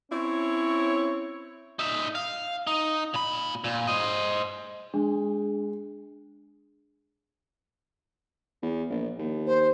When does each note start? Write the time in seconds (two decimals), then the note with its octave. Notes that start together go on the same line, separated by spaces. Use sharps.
0.11 C4 C#4 E4 C#5
1.79 D#4 E5
2.15 F5
2.67 D#4
3.14 A#2 B5
3.64 A#2
3.87 C5 D#5
4.94 G#3 D4
8.62 E2
8.90 A#1
9.18 D#2
9.46 C5